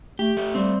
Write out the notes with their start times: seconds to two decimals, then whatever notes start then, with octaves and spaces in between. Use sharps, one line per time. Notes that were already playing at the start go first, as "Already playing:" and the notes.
0.19 A3 G4
0.37 A3
0.55 G3 C4